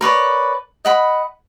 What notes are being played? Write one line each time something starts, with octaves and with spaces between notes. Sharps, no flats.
A#4 B4 C#5 D5
D#5 F#5 B5